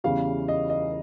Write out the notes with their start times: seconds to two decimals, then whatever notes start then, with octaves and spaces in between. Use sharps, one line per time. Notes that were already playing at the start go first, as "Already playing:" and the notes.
0.04 E2 C#3 E3 G3 F5
0.48 D#5
0.70 D#5